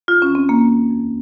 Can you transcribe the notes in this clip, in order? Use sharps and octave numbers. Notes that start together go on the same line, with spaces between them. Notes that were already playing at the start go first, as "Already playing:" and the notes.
D#2 F4
C#4
D#3
C4
D#2 A#3
D#3
F2